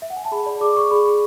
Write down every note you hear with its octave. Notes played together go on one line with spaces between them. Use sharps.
E5
F#5
G#5
A5
G#4 B5
D5
G#4 D6
D5 C#6
G#4 B5
G#4